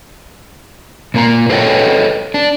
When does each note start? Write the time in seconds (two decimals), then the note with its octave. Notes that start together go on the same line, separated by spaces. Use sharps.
1.14 A#2 A#3 C5 A#5
1.49 G#4 A4 B4 C#5 D#5 G5
2.34 D4